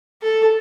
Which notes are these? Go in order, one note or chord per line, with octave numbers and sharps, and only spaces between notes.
A4